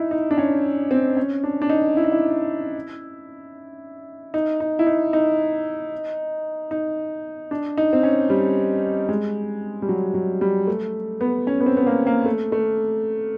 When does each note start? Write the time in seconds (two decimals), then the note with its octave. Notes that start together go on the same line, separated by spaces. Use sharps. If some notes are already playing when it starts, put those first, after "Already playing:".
Already playing: D#4 E4
0.11 D#4
0.31 D4
0.38 C#4
0.91 C4
1.17 C#4
1.44 D4
1.62 D4
1.69 D#4
1.97 E4
2.04 D#4
2.12 E4
4.34 D#4
4.60 D#4
4.79 E4
4.87 D#4
5.13 D#4
6.71 D#4
7.51 D4
7.77 D#4
7.93 C4
8.03 C#4
8.30 G3
9.09 G#3
9.82 G3
9.89 F#3
10.14 F#3
10.41 G3
10.67 A3
11.21 B3
11.47 C#4
11.60 B3
11.66 C4
11.77 B3
11.86 A#3
12.07 A#3
12.26 A3
12.52 A3